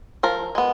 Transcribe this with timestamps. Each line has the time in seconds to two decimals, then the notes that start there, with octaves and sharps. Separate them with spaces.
0.23 F3 A#4
0.55 G#3 B3